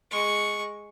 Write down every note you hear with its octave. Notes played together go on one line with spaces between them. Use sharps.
G#3 C#6